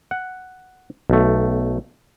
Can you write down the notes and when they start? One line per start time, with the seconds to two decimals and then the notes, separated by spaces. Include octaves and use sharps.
0.11 F#5
1.10 B1 A3